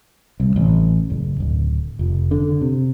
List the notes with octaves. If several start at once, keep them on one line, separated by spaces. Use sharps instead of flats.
C2
A1
F#1
D1
F1
D3
C3